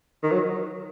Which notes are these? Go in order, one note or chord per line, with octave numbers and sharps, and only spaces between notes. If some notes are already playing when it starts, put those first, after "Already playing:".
D#3
F#3